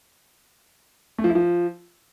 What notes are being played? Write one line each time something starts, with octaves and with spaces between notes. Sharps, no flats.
A3
F3
E4
F3